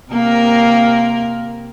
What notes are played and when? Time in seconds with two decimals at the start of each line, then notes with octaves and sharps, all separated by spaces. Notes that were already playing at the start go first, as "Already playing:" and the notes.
0.12 C3 A#3 A#4